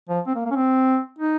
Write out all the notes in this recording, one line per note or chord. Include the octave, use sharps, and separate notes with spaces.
F3
C4
A#3
A#3
C#4
C4
D#4